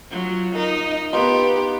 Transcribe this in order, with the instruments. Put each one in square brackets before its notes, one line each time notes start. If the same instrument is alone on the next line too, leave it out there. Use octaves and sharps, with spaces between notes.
[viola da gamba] F#3 [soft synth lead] F4
[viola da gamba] D#4 [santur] A#4
[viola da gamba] B3 G4 [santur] D#4 F4 B5 [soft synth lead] B4